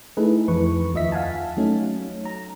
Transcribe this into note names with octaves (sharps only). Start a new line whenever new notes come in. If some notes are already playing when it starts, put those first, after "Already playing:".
A3 D#4 E4 G#4 A4 B4
F2 E3 B4 C#6
D#2 F3 D#5 E5 B6
F5 F#5 G#5 A5
F#3 A3 C#4 D#4
A#5